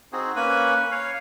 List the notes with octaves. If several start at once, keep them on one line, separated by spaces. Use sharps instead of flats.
C4 D#4 F#4 G#4
A#3 C#4 B4 G#5 B5
C#5 F5